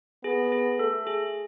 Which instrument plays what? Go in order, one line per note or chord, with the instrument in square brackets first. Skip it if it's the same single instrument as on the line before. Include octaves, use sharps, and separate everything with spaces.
[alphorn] B3 [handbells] G#4
[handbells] G#4
[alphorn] A3 [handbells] A4
[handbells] G#4